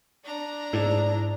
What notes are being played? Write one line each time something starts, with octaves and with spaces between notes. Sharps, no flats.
D4 A#5
G#2 E4 D5